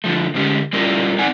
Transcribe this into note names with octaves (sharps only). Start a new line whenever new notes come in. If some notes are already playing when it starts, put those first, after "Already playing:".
D3 F3 A3
D3 G#3 C#4 G4
G3 C#4 E4 F4 A#4 D5
C4 D#4 D5 F#5 G#5